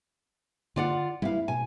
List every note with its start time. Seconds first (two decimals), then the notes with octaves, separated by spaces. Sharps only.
0.76 D3 F4 D5 F#5
1.22 G3 A3 B3 E4 F5
1.48 B2 G#5